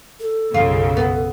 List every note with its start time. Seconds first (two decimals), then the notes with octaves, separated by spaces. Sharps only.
0.20 A4
0.54 B1 F#2 C#3 F4
0.97 B3